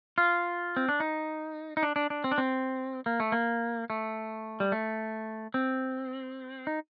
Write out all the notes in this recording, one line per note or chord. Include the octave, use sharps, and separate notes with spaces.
F4
C4
D4
D#4
D#4
D4
D4
D4
C4
D4
C4
A#3
A3
A#3
A3
G3
A3
C4
D#4